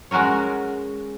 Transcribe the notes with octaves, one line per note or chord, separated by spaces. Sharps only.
G#3 C#4 F#4 A#4 C#5